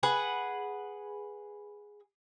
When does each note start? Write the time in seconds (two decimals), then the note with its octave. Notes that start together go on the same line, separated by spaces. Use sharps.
0.03 G#4 B4 F#5